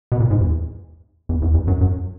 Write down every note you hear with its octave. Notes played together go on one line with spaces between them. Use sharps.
B2
A#2
G#2
E2
E2
E2
E2
F#2
F#2